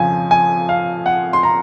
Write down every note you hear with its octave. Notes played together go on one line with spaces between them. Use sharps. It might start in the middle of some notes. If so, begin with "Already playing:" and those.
Already playing: F2 C#3 F3 G#5
G#5
F5
F#5
C6
A#5